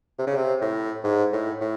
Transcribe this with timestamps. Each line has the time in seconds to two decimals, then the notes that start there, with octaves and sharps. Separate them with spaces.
0.19 C3
0.27 C#3
0.36 C3
0.62 A2
1.04 G#2
1.33 A2
1.61 A2